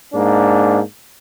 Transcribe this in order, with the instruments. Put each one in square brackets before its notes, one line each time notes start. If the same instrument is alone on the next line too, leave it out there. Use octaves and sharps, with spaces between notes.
[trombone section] G#2 A#3 D4